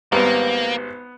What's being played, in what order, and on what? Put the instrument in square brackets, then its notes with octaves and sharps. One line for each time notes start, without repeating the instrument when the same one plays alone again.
[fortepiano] G#1 G3 [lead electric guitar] A#3 [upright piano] B3